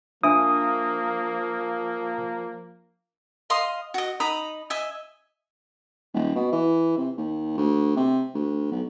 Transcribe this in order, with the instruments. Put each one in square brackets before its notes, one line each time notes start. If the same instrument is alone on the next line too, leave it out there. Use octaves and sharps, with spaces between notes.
[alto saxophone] F3 [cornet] A#3 [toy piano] D4 E5 G#5 [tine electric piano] D#6
[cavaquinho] D#5 F5 C6 D#6
F#4 D#5
D#4 A#5 B5 D#6
D#5 E5 G#5
[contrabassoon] D#1
B2
E3
C3
D#2
D2
C3
D2
B1